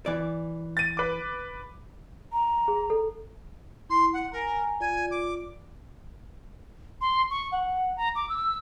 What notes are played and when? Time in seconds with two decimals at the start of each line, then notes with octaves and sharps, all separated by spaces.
0.06 E3 D5
0.77 A6 D#7
0.97 B4 D6
2.33 A#5
2.68 G#4
2.90 A4
3.90 E4 C6
4.13 F#5
4.32 A#4 G#5 A#5
4.80 F4 D5 G#5
5.10 D6
7.01 C6
7.30 C#6
7.52 F#5
7.96 A#5
8.15 D6
8.29 E6